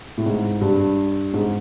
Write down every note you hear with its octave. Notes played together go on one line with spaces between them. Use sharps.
A2
G#2
G2
G#2